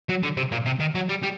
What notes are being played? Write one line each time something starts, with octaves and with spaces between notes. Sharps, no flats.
F#3
D3
C3
A#2
C3
D#3
F#3
G3
G3